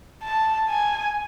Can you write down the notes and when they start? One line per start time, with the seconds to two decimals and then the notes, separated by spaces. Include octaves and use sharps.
0.23 A5
0.70 G#5